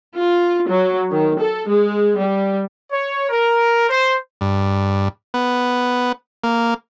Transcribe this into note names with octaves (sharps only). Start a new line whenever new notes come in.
F4
F#3
D#3
A4
G#3
G3
C#5
A#4
C5
G2
B3
A#3